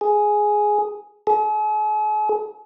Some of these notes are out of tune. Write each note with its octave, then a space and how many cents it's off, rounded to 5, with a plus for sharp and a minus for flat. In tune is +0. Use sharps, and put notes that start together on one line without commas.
G#4 +5
G#4 +45